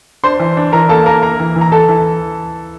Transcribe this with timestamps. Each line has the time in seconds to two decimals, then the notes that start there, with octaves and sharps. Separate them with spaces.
0.23 D4 C5 C6
0.39 E3
0.57 D4
0.72 E3 A#4 A#5
0.89 A#3 A4 A5
1.06 A#3 A#4 A#5
1.23 A#3 A#4 A#5
1.40 E3
1.56 E3
1.61 A#5
1.72 E3 A4 A5
1.88 E3